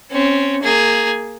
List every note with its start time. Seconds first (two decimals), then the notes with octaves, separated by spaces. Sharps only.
0.10 C4 C#4
0.62 A#3 G#4